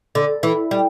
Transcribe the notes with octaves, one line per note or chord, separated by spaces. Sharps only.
D3
E3
G3